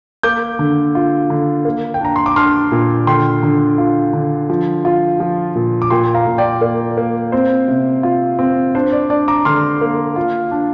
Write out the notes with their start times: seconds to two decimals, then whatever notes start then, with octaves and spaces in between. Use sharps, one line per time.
0.23 A#3 D6 G6
0.59 D3
0.95 F4
1.30 D3
1.65 A#3
1.94 G5
2.01 D4 A#5
2.16 C6
2.26 D6
2.36 D4 C6 F6
2.72 A#2
3.07 D3 G5 C6
3.43 D3
3.78 F4
4.13 D3
4.50 F3
4.85 F4
5.20 F3
5.55 A#2
5.82 D6
5.90 A#2 G5 C6
6.14 F5 A#5
6.27 A#2
6.38 D5 G5
6.61 A#3 D5
6.97 A#3
7.32 C4 C5
7.68 C3
8.03 F4
8.39 C4
8.75 D4 C5
8.92 D5
9.10 D4 D5
9.28 A#5 D6
9.45 D3 C6 F6
9.81 A#3
10.16 F4
10.51 D4